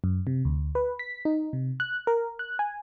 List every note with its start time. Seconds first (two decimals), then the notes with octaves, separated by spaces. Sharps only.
0.04 F#2
0.27 C3
0.45 D2
0.75 B4
0.99 B6
1.25 D#4
1.53 C3
1.80 F#6
2.07 A#4
2.39 F#6
2.59 G#5